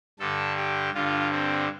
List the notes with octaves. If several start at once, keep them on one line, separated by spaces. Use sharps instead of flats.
G2 D3 A4
G4
G2 D3 F4
C4